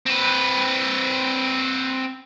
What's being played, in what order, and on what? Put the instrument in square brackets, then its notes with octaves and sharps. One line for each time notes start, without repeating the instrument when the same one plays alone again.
[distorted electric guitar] C4 B4